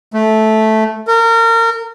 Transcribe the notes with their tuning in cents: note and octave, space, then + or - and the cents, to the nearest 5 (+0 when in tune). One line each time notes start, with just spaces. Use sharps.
A3 -10
A#4 -30